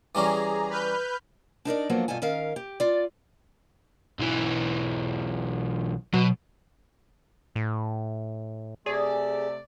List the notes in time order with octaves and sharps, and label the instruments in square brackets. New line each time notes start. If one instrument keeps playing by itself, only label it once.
[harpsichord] E3 G3 C#4 [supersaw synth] G#4 A#5
[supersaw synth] B4 F6 G6
[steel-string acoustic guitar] D4 D#4 A#4 D5
F3 F#3 A#3 B3 D4
G2 B2 F4 A4 G#5
D#3 C#4 A#4 F5
G4
F4 D5
[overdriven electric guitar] B1 E3
[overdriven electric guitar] B2 [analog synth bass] F#3
[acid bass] A2
[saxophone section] C3 A3 D5 [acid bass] G#4